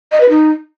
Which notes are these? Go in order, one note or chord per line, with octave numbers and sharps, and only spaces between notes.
D#5
B4
D#4